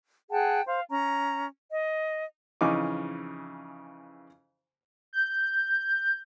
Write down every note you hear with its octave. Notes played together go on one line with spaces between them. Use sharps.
G#4 F#5 G5 A5
C5 F5
C#4 A#5
D#5
F2 C#3 E3 D#4 G#5 D6
G6